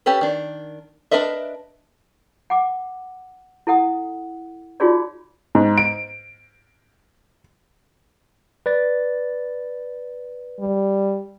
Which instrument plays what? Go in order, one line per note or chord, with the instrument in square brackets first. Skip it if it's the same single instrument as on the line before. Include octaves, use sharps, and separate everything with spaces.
[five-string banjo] C#4 G4 A4 B4
D#3 D4
D4 A#4 B4 D#5 E5
[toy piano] F#5 D6
E4 A4 F#5 D#6
D#4 F4 F#4 G#4 C#5 D5
[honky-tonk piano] G#2
D7
[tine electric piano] B4 D5 A6
[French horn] G3